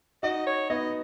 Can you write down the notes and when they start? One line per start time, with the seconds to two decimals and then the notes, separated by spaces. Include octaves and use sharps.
0.23 D#4 F#4 D#5
0.47 C#5
0.70 B3 D#4 D#5